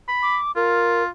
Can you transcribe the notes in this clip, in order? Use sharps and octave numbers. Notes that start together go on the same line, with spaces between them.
B5
D6
F4 A#4